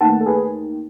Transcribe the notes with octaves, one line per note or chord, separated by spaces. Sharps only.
D#2 D#3 A3 F#5 A5
A4
G#4 B4